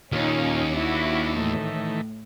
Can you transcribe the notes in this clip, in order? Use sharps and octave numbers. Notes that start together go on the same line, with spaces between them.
D#2 A#2 C#4 D#4 F4
D4 E4 F#4
A2 D#3 E3 A3